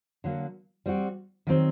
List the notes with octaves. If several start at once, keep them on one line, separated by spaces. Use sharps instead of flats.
D3 F#3 A#3
G3 C4 F#4
D#3 F#3 C4